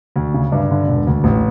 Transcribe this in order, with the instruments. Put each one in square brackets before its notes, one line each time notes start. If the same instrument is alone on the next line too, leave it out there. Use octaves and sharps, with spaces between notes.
[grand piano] D2
C#3
G2
D3
E1
D2
A1